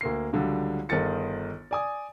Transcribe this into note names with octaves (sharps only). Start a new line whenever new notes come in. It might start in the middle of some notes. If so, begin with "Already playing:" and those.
D2 A#3 C7
C#2 D3 F#3 G3
G1 D#3 D#4 G#4 A6 C#7
D5 G#5 D#6